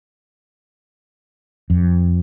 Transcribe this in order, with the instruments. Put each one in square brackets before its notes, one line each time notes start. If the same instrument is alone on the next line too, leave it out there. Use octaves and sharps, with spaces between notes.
[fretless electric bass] F2